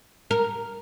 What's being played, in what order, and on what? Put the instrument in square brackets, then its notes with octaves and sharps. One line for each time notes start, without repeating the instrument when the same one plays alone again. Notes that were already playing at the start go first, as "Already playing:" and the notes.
[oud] A#4